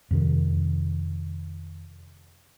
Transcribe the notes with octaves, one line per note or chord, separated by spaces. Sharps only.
F2 C3 D#3